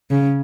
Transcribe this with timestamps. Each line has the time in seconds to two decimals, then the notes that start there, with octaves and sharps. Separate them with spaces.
0.11 C#3